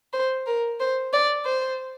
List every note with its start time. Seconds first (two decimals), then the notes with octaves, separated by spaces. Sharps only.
0.13 C5
0.46 A#4
0.80 C5
1.13 D5
1.45 C5